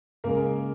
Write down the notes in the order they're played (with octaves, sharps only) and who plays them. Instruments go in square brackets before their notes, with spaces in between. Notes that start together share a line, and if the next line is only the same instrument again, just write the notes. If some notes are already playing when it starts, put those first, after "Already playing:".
[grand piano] C#3 G#3 A#3 A#4